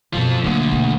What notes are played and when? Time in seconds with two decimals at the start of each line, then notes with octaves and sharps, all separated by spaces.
0.13 F#2 B2 F3 A4
0.44 D2 D3 F#3 A#3
0.72 B2 A#3